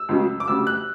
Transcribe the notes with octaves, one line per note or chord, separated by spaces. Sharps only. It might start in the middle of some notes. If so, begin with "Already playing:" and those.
Already playing: E6
C#2 C#3 F#3
D6
D2 C#3 G3 E6
F#6